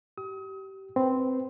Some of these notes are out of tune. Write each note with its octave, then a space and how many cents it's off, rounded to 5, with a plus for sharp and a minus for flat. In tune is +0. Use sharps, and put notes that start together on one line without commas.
G4 -25 D#6 +35
C4 -5 B4 +0